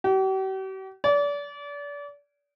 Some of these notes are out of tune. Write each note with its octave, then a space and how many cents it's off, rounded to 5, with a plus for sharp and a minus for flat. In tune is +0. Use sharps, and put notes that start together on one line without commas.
G4 -45
D5 -35